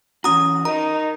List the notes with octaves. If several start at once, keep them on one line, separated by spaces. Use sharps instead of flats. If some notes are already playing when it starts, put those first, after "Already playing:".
E3 C#4 F#4 A#5 D#6
D#4 A#4 D#5 A#5